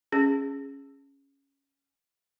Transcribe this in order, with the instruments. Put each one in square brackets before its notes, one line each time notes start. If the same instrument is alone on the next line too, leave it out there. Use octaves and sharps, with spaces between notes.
[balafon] C#4 G#4